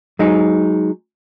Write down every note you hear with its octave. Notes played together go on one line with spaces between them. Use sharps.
F#3 G#3 D#4